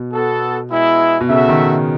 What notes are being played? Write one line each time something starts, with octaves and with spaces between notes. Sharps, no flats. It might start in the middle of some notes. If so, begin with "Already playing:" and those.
Already playing: B2
B3 F#4 A4
G#3 B3 E4
B2
C#3 F#4 A4 E5
D#3